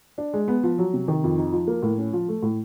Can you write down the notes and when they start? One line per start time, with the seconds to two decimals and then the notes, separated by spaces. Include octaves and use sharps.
0.18 D4
0.34 G#3
0.48 B3
0.63 F3
0.78 F#3
0.94 C3
1.08 D#3
1.24 F2
1.38 D#4
1.53 F3
1.68 A#3
1.83 A2
1.98 C#4
2.13 F3
2.29 A3
2.43 A2